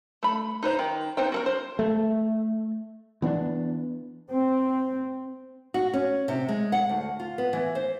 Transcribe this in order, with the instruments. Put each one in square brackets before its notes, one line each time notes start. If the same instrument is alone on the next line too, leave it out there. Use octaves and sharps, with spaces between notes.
[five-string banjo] A3 B5
D#4 B4 C5 A#5
D#3
B3 D#4 C5 G5
F#4 A4 A#4
C5
[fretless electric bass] A3
E3 B3 C4 D4
[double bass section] C4
[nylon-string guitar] F#4
C#4
C3
G#3
F#5
D2
F4
B3
E3
C5